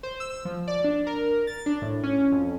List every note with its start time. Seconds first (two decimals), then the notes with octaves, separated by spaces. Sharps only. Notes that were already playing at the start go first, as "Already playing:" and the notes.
0.03 C5
0.20 E6
0.45 F3
0.68 D5
0.84 D4
1.07 A#4
1.47 A6
1.66 D4
1.82 A2
2.03 C#4
2.32 F2